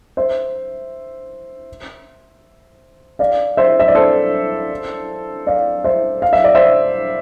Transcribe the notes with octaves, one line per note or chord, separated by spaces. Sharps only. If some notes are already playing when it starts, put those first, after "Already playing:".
C5 E5
D5 F5
C5 E5
E5
D5
A4 C5
D5 F5
C5 E5
F5
E5
D5
C5 E5